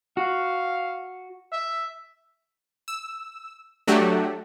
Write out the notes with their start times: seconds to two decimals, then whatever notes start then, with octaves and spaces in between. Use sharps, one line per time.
0.17 F#4 F5
1.52 E5
2.88 E6
3.88 F#3 A3 D4 F#4 G4